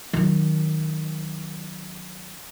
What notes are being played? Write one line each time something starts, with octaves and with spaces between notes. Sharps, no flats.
D#3 F#3